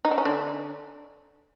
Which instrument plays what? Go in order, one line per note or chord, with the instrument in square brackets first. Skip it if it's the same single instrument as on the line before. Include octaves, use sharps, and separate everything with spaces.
[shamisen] D#4
D4
C#4
D3 D4